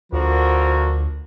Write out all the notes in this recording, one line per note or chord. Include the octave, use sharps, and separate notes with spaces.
D2 D3 F3 F#4 A#4